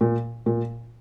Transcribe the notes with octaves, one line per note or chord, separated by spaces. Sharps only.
A#2
A#2